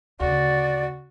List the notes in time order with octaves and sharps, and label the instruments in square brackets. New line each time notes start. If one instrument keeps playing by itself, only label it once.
[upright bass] D2 C#3 [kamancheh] F#4 [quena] D5